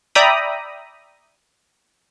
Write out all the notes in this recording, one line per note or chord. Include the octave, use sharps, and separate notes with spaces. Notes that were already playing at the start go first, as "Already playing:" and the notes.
D5 E5 G5 A#5 B5 D#6